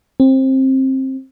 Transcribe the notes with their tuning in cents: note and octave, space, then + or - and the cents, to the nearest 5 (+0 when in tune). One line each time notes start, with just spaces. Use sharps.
C4 +20